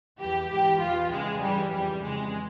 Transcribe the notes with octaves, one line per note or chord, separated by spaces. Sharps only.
E2 E3 G4
G#2 E3 G4
E2 E3 F4
E2 C#3 E3 G#3
G2 E3 G3
F2 E3 G3
F2 C#3 E3 G#3